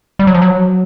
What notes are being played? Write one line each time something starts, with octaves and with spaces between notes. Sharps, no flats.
G3
F#3
F3
F#3